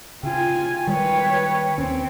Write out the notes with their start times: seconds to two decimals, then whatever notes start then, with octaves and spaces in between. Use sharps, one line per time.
0.23 C#3 F4 G5 G#5
0.87 D#3 G3 G#3 B4 C#5
1.78 D#2 D#3 C4 C#4